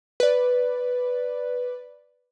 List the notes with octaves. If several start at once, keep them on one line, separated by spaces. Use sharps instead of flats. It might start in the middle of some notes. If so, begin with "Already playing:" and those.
B4 D5